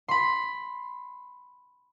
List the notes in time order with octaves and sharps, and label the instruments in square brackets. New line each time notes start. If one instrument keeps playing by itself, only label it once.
[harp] B5 C6